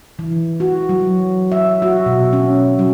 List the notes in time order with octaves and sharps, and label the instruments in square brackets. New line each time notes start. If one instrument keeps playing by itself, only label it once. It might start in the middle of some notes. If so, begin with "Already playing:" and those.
[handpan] E3
F#4
F#3
E5
F#4
B2
C#4
F#3